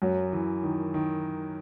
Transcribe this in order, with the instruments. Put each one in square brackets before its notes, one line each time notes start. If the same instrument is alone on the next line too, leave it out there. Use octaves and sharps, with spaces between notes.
[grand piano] F#2 F#3
E3
D#3
D#3